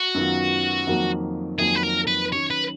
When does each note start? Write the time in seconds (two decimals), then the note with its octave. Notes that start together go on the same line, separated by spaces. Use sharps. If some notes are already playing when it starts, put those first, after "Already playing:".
Already playing: F#4
0.14 F#2 D#3 F#3 B3 F4
0.87 F2 D#3 F#3 A#3
1.59 F2 D#3 F#3 A#3 G#4
1.75 B4
1.83 A#4
2.07 B4
2.32 D#3 F#3 C#4 C#5
2.50 B4